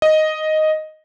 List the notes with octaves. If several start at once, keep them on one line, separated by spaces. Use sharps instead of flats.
D#5